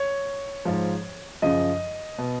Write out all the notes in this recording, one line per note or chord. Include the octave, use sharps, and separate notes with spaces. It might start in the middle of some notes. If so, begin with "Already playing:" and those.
Already playing: C#5
G#2 F3
F#2 C#3 F3 D#5
B2